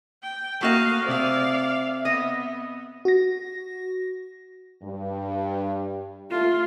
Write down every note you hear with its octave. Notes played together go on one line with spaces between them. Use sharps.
G5
A3 A#3 F#4 D#5 F5
C3 C4 D5 E5 F5
B3 D#5
F#4 A#6
G2
A3 F4